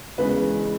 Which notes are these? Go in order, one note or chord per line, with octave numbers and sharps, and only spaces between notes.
E2 C#3 G#3 B4